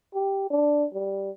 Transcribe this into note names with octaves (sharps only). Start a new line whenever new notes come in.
G4
D4
G3